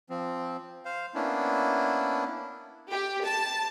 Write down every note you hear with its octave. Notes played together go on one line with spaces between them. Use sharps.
F3 C4
C5 F5
A#3 B3 C#4 D4 E4
G4
A5